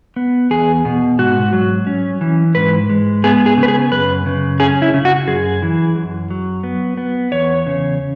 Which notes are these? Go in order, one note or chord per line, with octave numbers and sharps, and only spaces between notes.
B3
E2 G#4
B2
G#2 F#4
F#3
C#4
E3
G#2 B4
G#3
B3 G#4
G#4
C#3
B4
G#4
F#2 B4
C#3
C#4 G#4
E4
C#3
F#4
F#2 G#4
E3
F#2
F#3
B3
B3
E2 C#5
C#3